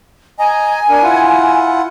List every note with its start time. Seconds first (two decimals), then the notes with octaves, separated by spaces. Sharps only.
0.39 D#5 G#5 A#5
0.89 D4 A#4
1.03 E4 F4 F#5